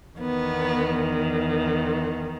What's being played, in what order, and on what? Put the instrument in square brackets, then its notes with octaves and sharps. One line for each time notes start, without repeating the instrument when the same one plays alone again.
[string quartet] E2 D#3 B3